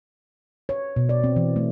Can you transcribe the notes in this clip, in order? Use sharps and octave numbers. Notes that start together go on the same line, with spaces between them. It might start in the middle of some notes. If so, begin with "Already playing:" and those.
C#5
B2
D5
C4
E3
A3